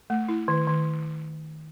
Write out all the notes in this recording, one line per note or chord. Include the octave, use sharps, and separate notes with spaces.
A3
E4
D#3
D#3